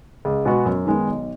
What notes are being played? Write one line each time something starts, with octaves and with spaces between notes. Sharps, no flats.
C#2
B2 G#3 B3 F#4
F#2
D#3 G#3 B3 D#4
B1